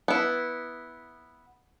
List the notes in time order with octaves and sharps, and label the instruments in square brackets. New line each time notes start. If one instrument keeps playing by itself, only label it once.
[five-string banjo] B3 E4